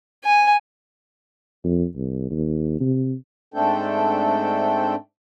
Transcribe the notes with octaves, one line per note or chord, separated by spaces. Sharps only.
G#5
F2
C2
D#2
C3
G#2 A3 C4 D4 A4 G5